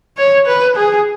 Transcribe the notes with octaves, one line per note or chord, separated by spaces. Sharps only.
C#5
B4
G#4